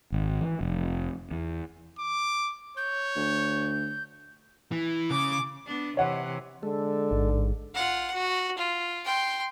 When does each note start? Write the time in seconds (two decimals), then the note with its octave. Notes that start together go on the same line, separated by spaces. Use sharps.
0.12 G#1
0.41 E3
0.61 F1
1.31 E2
1.99 D6
2.77 C#5 G6
3.16 D2
4.72 E3
5.11 C#3 D6
5.66 B3 D4
5.97 C3 E3 C#5 F#5
6.63 D3 G#3 A4
7.11 A1 G#2
7.75 F4 F#5
8.14 F#4
8.58 F4
9.05 G5 C6